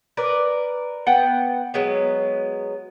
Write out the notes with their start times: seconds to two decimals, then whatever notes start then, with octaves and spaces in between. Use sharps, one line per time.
0.17 A#4 B4 D5
1.06 B3 F#5 G5
1.74 F#3 G#3 B3